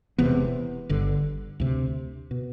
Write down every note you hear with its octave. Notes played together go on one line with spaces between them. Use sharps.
E1 E2 C3 B3
G1 G2 D3
D2 C3
B2